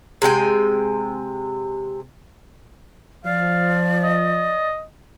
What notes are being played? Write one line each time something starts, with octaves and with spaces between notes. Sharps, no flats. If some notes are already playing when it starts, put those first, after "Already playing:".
C3 G#3 G5 G#5
F3 D5 F5
D#5